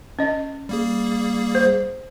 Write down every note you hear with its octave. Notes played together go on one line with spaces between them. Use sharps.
C#4 D#5
G3 A#3 G#4
C5